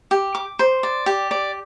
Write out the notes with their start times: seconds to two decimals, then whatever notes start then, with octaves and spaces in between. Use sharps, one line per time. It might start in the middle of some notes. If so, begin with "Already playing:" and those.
0.11 G4
0.35 D6
0.59 C5
0.83 D5
1.06 G4
1.31 D5